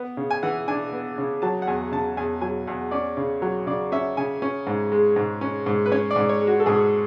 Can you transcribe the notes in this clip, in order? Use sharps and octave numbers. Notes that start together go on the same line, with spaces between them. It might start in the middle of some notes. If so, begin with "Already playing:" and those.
Already playing: B3
C#3
G#5
E3 F#5
D4 G#5
B3
C#3
F#3 A5
F#5
E2 G#5
C#3 A5
E2 G#5
F#3 G#5
E2 F#5
C#4 D5
C#3
F#3
C#3 D5
C#4 E5
C#3 G#5
C#4
G#2
G#3
G#2
C#4
G#2
B4
C#4 C#5
D5
G#2
C#5
G#3
F#4
A4
G#2 G#4